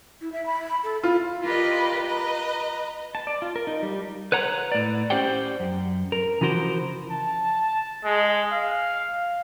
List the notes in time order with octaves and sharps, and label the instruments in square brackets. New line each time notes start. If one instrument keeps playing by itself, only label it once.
[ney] E4
E5
B5
A4
[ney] E4 [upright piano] F4
[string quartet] F4 G4 A#4 B4 D5 D#5
B4 D#5 A#5
[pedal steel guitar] A5
D5
F4
A#4
D#4
G3
[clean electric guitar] B4 C#5 F#5 A#5
A2 D5
C#4 G4 C5 D5 F#5 G5
F#2
A#4
C#3 E3 F3 F#4 A#4 C5
[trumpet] A5
G#3
F5